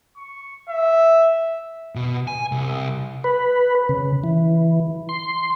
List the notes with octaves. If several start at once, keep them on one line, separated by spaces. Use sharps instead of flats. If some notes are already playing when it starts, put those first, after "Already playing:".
C#6
E5
B2
G#5
C2
B4
C#3
E3
C6